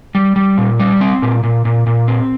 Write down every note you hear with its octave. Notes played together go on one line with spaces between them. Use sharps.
G3
G3
A#2
G3
C4
A#2
A#2
A#2
A#2
C4